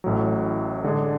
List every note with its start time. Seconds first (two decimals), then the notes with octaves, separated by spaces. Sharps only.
0.04 A1 A2 F#3
0.84 D3 G#3 D4 G#4 D5